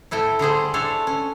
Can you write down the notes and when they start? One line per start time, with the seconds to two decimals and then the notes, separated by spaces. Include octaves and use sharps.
0.11 A2 E4 A4 G5
0.39 D3 G3 G#4 C5
0.74 D4 E4 A4 C5 C#5
1.07 C#4